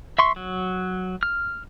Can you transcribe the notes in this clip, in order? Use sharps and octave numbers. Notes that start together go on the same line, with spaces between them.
E5 C6 C#6
F#3
F6